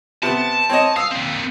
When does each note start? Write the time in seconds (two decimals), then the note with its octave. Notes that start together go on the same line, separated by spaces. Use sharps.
0.23 C3 B3 A5
0.69 C4 C#5 D#5
0.96 F5 D#6 E6
1.11 A#3 C4